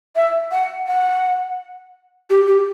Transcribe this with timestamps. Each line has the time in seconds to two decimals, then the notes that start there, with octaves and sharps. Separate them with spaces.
0.15 E5
0.51 F#5
0.87 F#5
2.29 G4
2.46 G4